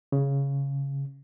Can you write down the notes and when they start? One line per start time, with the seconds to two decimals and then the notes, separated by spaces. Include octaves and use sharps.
0.12 C#3